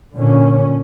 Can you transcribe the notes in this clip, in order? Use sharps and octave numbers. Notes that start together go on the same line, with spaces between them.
A#2 D3 C#4